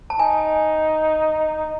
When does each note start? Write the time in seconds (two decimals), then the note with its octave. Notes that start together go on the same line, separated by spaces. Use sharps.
0.10 A5
0.19 D#4 G#5